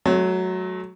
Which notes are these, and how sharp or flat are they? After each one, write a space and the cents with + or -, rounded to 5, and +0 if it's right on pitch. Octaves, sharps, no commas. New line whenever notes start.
F#3 +0 A3 -40